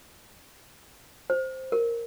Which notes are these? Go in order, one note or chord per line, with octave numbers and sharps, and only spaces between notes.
C5
A#4